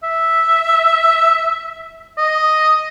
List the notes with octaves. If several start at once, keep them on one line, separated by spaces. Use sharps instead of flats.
E5
D#5